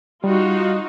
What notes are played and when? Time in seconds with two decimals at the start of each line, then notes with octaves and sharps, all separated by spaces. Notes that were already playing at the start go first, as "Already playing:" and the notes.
0.24 G3 D#4 F4 F#4